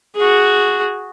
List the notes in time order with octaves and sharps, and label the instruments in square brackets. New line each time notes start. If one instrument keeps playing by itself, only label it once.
[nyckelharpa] F#4 G#4